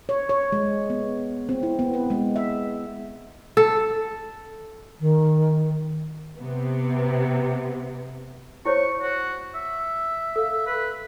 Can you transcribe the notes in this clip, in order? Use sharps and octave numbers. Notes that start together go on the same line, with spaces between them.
C#5
C#5
G#3
B3
C4
E4
B3
B4
G#3
E5
A4
D#3
C3 B3
E4 C5 C#5 C#6
F#4
E5
A4 F5
B4